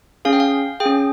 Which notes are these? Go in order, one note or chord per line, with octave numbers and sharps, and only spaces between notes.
C#4 G#4 F5
G5
F5
G#4 G5
C#4